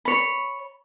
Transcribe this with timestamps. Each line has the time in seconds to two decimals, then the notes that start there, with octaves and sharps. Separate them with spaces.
0.05 C#5 B5